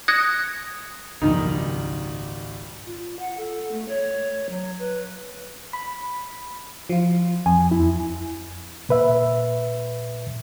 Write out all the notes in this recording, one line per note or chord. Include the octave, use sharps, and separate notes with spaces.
D#6 F#6 G#6 A#6 C#7
G#1 C#2 F#2 A#2 D#3 F3 G3 D#4
F4
F#5
A4
A3
C#5
F#3
B4
B5
F3 F4
F2 G#5
E2 E4
A#2 B4 E5